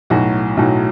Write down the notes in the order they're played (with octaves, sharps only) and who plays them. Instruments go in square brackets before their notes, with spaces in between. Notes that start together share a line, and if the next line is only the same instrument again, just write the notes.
[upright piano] B1 A2 F#3 F#4
B1 A2 F#3